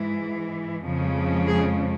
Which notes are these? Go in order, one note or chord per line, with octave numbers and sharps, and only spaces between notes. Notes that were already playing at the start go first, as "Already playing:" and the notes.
Already playing: G#2 E3 G#3
F2 C#3 F3 G#3
G#4